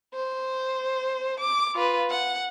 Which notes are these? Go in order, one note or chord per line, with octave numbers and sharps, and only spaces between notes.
C5
D6
F4 B4
F#5